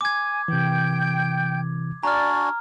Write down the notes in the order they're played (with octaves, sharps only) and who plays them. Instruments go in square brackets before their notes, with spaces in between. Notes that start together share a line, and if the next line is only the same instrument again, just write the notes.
[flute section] G#5 [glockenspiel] D6 G#6
[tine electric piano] C3 E3 [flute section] G5 G6
[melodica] D4 F#4 G#5 [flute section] D5 [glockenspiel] A#5 F6